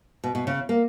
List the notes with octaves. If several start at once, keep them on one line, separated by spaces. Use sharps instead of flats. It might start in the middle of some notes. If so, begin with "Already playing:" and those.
B2
B2
C#3
A#3